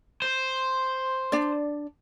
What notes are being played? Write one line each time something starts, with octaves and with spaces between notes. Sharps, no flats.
C5
D4 D5